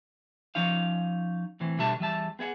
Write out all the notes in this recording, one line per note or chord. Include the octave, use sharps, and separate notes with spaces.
F3 C#4 D#4 F5
A2 E3 C4
B2 D3 G3 A4 E5 A5
E2 G3 E5 A5
B3 G#4 E5 F#5